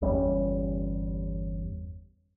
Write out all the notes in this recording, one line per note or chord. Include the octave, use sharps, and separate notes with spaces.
G1 E2 G3 C#4